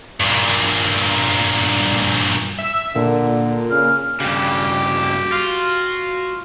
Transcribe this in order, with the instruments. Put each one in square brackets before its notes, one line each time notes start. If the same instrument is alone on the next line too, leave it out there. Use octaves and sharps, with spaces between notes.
[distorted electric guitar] G2 A#2
[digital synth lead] E5
[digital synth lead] A#2 [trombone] D3
[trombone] C#3 [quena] F6
[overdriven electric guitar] G2 C#3 [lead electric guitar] F#4 G5 [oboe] G4
[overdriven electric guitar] F4